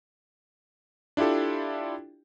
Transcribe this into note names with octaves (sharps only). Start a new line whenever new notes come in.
D4 E4 F4 G4 A4